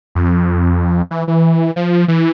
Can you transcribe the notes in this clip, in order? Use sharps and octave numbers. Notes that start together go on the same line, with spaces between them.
F2
E3
E3
F3
E3